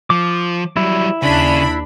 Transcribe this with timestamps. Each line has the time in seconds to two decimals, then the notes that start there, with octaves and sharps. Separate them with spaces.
0.10 F3 D6
0.77 F#3 G3 E4
1.23 D#2 C#3 D4 B5